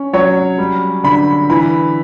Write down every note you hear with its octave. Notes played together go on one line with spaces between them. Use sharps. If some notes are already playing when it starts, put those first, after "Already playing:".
Already playing: C#4
F#3 C#5
G3
D3 B5
E3 B5